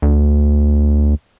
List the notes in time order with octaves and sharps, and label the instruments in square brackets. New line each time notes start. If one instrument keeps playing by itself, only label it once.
[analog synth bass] D2